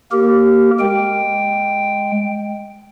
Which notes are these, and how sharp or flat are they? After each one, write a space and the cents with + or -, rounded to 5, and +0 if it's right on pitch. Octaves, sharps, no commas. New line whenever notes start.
A#3 +0 G4 -20 A#4 -10
G#3 +0 G5 +0